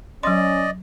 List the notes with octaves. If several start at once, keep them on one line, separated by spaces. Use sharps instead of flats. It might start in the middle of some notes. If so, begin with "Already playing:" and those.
F#3 C#4 D5 D#5 C6